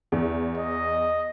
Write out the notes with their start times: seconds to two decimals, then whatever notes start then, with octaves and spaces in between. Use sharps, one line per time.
0.12 E2
0.57 D#5